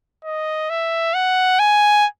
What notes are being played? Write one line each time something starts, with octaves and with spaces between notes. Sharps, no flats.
D#5
E5
F#5
G#5